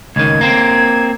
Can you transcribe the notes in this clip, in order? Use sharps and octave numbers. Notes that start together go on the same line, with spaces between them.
C#2 D#3 G#6
A#3 C4